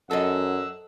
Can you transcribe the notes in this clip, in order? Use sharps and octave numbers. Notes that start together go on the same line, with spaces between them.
F#2 A4 C5 D#5 F#5 E6